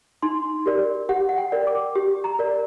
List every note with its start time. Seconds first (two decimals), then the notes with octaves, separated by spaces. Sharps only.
0.22 D#4 C6
0.66 G4 A#4 D5
1.09 G4 F#5
1.29 F#5
1.38 G5
1.52 A#4 D5
1.67 D6
1.96 G4
2.24 A#5
2.39 A#4 D5